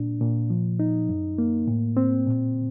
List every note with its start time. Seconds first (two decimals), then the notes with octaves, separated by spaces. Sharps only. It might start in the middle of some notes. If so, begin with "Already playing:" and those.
Already playing: A#2 D4
0.21 A#2
0.50 F3
0.80 D#4
1.09 F#2
1.38 A#3
1.68 A2
1.97 C4
2.26 A#2